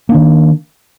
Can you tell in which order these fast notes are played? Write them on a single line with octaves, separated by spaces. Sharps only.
A#3 D4 D#3